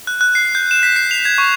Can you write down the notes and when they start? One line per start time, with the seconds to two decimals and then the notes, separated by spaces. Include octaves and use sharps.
0.07 F#6
0.21 F#6
0.35 C7
0.55 G6
0.71 E7
0.83 B6
0.96 C7
1.11 F7
1.25 G#6
1.38 C#6